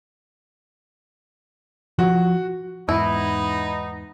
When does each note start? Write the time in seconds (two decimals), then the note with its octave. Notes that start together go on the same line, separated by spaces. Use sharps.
1.99 F3 F#4
2.89 E2 G#2 B3 D#4 E4 B5